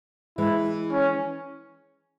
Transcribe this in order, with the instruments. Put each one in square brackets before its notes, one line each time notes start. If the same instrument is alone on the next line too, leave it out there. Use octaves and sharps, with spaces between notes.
[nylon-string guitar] E3 G#3 [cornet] E4
[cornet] C#4